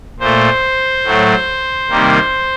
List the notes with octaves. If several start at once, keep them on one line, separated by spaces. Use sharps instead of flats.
A#2 A3 C5
A2 F#3 A3
C3 D#3 G3 A#3